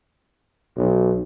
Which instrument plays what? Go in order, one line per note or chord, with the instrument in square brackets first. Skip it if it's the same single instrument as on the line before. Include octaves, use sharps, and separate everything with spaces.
[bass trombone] B1